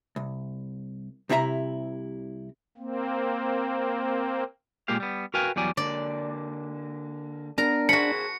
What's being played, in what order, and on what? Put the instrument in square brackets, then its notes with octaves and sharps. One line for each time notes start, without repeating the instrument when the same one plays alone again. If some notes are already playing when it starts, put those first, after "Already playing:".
[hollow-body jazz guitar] C2
C2 C3 E4 A4 E5 A#5
[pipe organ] A#3 C4
[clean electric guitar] A#2 G#3 A#3 G4 F5
G3 B3
F#4 A#4 B4 F5 G5 G#5
E2 F#3 G3 D5 G#5
[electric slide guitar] D3 A#3 [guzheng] D5
[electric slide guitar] B3 [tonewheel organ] D4 [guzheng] A#4 A#5
[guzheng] F#4 B5 [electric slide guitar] G#4 C5 A5 [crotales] C#7